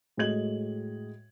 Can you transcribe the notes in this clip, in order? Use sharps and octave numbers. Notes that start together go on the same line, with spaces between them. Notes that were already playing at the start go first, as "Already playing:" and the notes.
A2 G#3 F#4 D#5 G#6 F#7